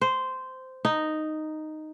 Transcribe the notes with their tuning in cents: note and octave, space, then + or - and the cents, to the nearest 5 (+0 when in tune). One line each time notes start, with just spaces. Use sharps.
C5 -10
D#4 -5